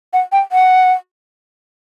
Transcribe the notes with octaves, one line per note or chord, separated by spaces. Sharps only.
F#5
G5
F#5